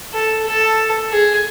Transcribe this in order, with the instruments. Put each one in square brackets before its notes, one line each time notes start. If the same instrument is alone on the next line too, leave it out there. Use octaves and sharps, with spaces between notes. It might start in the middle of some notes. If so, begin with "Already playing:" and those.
[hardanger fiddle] A4
A4
G#4